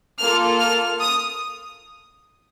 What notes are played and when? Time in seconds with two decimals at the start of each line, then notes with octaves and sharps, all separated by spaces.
0.19 A#3 F4 A4 F6
0.60 F6
1.00 D#6